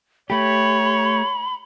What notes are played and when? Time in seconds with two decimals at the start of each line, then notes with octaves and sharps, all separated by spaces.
0.30 A3 G4 C#5 B5